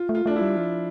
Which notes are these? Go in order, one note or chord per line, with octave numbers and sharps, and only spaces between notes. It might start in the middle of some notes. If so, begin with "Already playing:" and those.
Already playing: F4
A3
F4
A3 D4
E4
G3
F3 F4